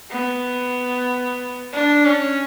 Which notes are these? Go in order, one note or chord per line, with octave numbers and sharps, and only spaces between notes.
B3
D4
C#4